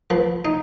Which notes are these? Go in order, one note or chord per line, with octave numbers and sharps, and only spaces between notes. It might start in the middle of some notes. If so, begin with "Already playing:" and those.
F3 B4
D#4